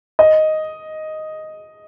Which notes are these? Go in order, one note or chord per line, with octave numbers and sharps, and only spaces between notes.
D#5